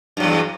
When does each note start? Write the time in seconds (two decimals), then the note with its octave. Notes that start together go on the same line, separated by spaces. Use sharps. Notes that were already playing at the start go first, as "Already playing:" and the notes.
0.17 G2
0.20 F#3
0.23 E2